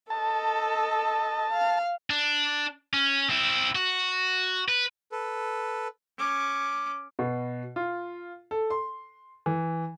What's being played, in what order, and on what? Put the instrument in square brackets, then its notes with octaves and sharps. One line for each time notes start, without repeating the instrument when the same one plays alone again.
[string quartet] A4 D#5 [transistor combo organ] A5
[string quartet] F5
[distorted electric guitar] D4
C#4
C4 E4
F#4
B4
[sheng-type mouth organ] A4 B4
[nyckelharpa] C#4 D6
[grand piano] B2
F4
A4
C6
E3